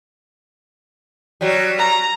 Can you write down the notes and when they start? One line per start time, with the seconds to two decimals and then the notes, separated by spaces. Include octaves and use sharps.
1.41 F#3 G3
1.78 A#5